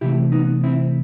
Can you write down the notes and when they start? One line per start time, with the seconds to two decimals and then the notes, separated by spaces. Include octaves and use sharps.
0.01 C3 E3 A3 E4 G4
0.32 B3 D#4
0.64 C4 E4